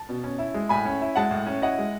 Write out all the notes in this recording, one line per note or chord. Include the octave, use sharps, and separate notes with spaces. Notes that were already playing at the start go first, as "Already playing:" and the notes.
Already playing: A5
B2
C#4
E4
G#3
A2 G#5 B5
C#4
E4
G#3 F#5 A5
A2
C#4
E4 D#5 F#5
G#3